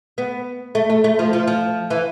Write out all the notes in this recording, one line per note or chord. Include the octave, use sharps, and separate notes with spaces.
B3
A3
A3
A3
F3
F3
F3
E3